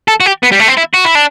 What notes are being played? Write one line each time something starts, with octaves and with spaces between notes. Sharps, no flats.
A4
F#4
G4
B3
G3
A3
C4
E4
F#4
E4
D4